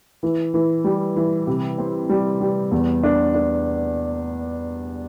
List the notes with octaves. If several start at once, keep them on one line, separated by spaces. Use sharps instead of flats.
E3
E3
G3
E3
C3
C4
G3
G3
E2
D4
D4